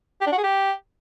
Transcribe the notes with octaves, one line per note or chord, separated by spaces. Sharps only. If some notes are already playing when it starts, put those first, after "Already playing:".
G4
D4
F#4
G#4
G4